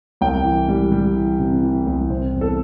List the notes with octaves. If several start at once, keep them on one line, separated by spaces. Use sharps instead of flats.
C2 G5
E3
G3
G3
E3
C3
E3
C2
C3 C5
E2
A4